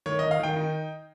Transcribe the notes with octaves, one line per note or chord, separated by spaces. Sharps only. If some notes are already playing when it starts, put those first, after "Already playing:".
D#3 C#5
D#5
D#3
F5
D#3 G5
D#4